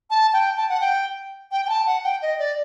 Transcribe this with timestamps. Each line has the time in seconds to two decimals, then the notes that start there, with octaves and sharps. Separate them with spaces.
0.10 A5
0.34 G5
0.57 A5
0.69 F#5
0.81 G5
1.52 G5
1.65 G5
1.69 A5
1.87 F#5
2.04 G5
2.22 D#5
2.39 D5